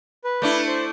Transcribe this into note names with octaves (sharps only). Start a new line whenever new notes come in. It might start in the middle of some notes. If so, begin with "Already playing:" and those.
B4
A3 D4 E4
C5